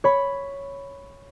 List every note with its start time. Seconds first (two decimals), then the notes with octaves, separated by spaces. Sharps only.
0.04 C#5 B5